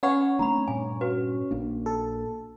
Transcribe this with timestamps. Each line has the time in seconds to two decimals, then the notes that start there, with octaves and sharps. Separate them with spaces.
0.03 C#4 B4 C#5 F#5 B5
0.39 A3 C4 D4 A#5 B5
0.68 G2 A#2 G#5
1.01 F#4 B4
1.51 A#1 A#3 D4
1.86 A4